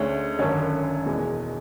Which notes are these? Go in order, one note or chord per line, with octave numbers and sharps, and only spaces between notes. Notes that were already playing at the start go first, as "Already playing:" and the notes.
Already playing: D2 D3 G#3 C#4 C#5
G#1 F#2 D3 C#4 C#5
E2 B2 G#3